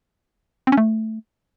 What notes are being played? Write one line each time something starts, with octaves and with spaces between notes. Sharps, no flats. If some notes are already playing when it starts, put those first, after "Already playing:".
C4
C#4
A3